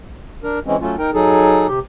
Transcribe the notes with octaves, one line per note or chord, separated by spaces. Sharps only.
D4 A#4
E3 G#3 C4 C#4
F#3 A3 C#4 F4
D#4 A#4 G5
F#3 D#4 G#4 A4
C3 G4